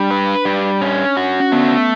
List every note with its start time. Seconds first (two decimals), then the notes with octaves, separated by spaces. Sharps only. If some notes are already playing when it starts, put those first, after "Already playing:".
Already playing: G3 D4
0.11 B4
0.45 G3
0.81 C#4
1.17 F#4
1.40 C#4
1.52 A3 B3